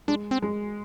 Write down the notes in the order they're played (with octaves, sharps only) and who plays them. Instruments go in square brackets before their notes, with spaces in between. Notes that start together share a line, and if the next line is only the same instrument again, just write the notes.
[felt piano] G#3 [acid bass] D4
[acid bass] C4
[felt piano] G#3